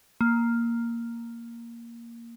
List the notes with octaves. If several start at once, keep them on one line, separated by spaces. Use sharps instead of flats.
A#3